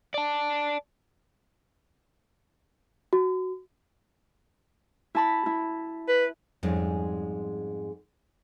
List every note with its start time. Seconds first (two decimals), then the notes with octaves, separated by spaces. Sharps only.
0.14 D5 A5
3.13 F#4
5.15 E4 A5 B5
5.46 E4
6.08 B4
6.63 F2 G#2 G3 G#3 C#4